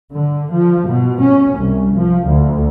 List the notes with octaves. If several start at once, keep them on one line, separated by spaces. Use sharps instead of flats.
D3
F3
B2
C#4
C2
F3
D2